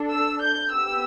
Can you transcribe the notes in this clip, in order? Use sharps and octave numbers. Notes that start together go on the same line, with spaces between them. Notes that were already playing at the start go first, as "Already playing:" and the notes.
Already playing: D4 A4
E6
G6
B3 G4 E6